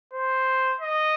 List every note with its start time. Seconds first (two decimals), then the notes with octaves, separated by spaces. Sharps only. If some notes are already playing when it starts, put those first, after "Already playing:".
0.14 C5
0.81 D#5